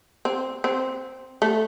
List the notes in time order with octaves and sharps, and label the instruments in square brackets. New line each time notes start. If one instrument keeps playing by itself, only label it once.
[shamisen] C4
C4
A3